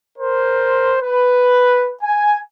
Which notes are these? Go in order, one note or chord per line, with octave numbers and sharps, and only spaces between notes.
A#4 C5
B4
G#5